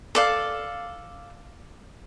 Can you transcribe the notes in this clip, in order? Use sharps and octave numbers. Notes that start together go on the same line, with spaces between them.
A4 D5 F5